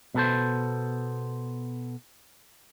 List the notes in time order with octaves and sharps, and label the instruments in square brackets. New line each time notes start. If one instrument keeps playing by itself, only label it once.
[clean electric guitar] B2 B3 A4 C5